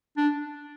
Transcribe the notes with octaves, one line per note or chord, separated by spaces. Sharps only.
D4